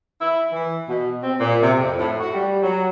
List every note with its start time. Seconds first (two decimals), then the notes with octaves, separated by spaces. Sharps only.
0.21 E4
0.53 E3
0.89 B2
1.23 C4
1.40 A#2
1.62 C3
1.80 F2
1.98 A2
2.20 F#4
2.33 G3
2.63 F#3